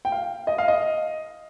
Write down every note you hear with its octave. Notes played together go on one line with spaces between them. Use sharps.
G5
F5
D#5
F5
D#5